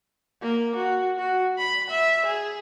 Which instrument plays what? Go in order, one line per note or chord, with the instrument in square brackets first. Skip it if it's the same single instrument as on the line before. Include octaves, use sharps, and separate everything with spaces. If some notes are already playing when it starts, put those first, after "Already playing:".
[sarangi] A#3
F#4
F#4
B5
E5
G#4